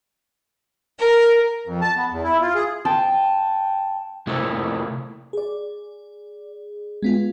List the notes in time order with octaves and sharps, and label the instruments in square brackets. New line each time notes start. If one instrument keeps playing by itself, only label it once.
[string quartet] A#4
[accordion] F2
A5
B3
E2
E4
F4
G#4
[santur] G5 A5 C6
[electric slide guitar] C3 A3 A#3 E4 A4
[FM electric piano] G#4 D5
G#3 B3 F4